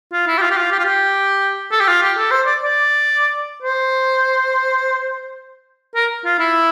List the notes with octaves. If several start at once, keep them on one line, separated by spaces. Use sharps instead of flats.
F4
E4
G4
F4
G4
F4
G4
F4
G4
A4
G4
F4
G4
A4
C5
D5
D5
C5
A#4
F4
E4